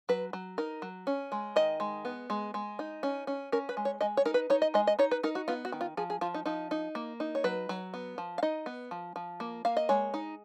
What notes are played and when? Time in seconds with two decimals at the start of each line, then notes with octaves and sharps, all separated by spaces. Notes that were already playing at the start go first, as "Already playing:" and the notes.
0.09 F#3 B4
0.33 F#3
0.58 D#4 A#4
0.82 F#3
1.07 C#4
1.32 G#3
1.56 D#3 D#5
1.80 G#3
2.05 B3
2.30 G#3
2.54 G#3
2.79 D#4
3.03 C#4
3.27 C#4
3.52 C#4 A#4
3.69 B4
3.77 G#3
3.85 C#5
4.01 G#3 D#5
4.17 C#5
4.25 D#4 A#4
4.34 B4
4.50 D#4 C#5
4.62 D#5
4.74 G#3 D#5
4.87 D#5
4.99 D#4 C#5
5.11 B4
5.23 D#4 A#4
5.35 F#4
5.48 B3 F4
5.65 F#4
5.72 D#3
5.81 F4
5.97 F3 G#4
6.10 G#4
6.21 F3 F4
6.34 D#4
6.46 F3 D#4
6.71 D#4
6.95 A#3
7.20 D#4
7.35 C#5
7.44 F#3 B4
7.69 F#3
7.94 B3
8.18 F3
8.38 F5
8.43 D#4 D#5
8.66 B3
8.91 F3
9.16 F3
9.40 A#3
9.65 A#3 F5
9.77 D#5
9.89 G#3 C#5
10.14 D#4